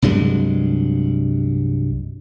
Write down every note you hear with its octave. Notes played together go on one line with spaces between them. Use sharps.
C2 G2 F#3 G#3